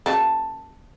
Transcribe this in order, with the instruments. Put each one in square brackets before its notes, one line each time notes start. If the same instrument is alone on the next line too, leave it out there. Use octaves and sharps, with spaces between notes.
[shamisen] C#3 F#3 A#3 [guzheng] A5